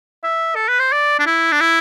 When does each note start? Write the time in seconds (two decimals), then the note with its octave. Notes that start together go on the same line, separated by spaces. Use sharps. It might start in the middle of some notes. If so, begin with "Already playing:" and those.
0.24 E5
0.55 A4
0.68 B4
0.80 C5
0.92 D5
1.19 D4
1.26 E4
1.52 D4
1.60 E4